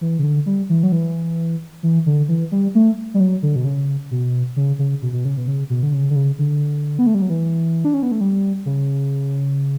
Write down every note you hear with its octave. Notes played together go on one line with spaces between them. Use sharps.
E3
C#3
D3
G3
E3
F#3
E3
E3
D3
E3
G3
A3
G3
F#3
D3
B2
C#3
B2
C#3
C#3
B2
B2
C#3
B2
C#3
B2
D3
C#3
D3
C#3
D3
B3
A3
G3
F#3
E3
D4
C#4
B3
A3
G3
C#3